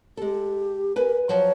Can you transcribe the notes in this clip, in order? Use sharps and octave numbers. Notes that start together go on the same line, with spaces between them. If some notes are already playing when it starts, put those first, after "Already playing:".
G#3 G4 A4
A#4 B4 G#5
F3 F#3 C#5